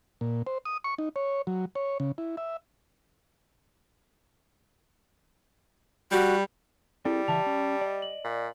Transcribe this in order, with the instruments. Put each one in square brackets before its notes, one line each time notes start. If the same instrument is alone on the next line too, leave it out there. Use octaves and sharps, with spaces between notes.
[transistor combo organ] A#2
C5
D#6
C#6
D#4
C#5
F#3
C#5
C#3
E4
E5
[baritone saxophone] G3 [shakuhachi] F#4
[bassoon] G3 [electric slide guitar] C4 G#4 A4 [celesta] E4
[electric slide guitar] C#3 E3 E5 [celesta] A5 F7
[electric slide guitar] C#4
D5 D#5
[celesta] F#7
[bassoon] A#2